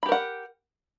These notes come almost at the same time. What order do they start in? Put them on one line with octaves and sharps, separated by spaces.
B5 G4 A#4 F#5